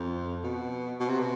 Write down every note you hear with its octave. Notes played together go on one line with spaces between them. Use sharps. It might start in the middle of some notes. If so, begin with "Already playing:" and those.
Already playing: F2
B2
B2
C3
B2